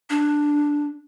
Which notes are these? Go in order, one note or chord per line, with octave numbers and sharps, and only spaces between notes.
D4